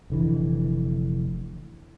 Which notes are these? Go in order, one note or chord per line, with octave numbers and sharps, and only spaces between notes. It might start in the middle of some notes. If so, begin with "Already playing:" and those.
F1 D3 E3